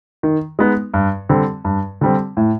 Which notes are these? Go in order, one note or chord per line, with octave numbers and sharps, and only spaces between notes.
D#3
G#3 B3 D#4
G2
D3 G3 C4
G2
D3 G3 C4
A2